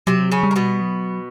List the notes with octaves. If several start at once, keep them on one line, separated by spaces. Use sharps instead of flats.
C3 F#3 C4
C#3 C#4
G3
A#3
B2 B3
F#3